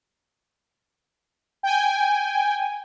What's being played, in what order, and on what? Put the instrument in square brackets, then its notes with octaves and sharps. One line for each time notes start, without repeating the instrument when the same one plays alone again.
[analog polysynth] G5 G#5